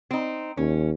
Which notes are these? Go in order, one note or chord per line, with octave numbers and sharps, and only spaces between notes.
C4 D#4
D#2 C#4